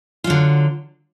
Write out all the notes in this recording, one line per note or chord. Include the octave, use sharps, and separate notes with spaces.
D3 F#3 F4